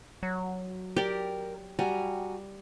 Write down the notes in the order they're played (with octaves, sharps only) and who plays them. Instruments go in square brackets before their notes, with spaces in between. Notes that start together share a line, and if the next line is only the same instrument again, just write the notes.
[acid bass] F#3
[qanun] G4 D5 [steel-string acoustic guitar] A#4
[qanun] G3 [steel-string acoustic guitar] F#4 G#5 A#5